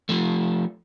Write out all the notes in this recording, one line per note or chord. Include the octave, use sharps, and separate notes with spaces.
F3 A3